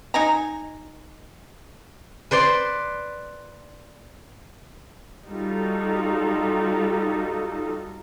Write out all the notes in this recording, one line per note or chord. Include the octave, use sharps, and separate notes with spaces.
D#4 G#5 A#5
B4 C5 D5 C6
G3 D#4 F4 F#4 A4